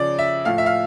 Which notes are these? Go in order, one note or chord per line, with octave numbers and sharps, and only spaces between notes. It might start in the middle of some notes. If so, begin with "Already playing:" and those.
Already playing: C#3 F3 D5
E5
A2 F3 F5
E5
F5